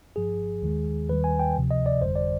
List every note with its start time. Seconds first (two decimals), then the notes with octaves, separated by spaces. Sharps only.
0.16 G1 G2 F3 G#4
0.62 D#2 D#3 G#3
1.09 D#2 D#3 G3 B4
1.24 G#5
1.39 G5
1.55 D2 C3 F3
1.71 D#5
1.86 D5
2.02 G1 F2 D3 G3 C5
2.16 D5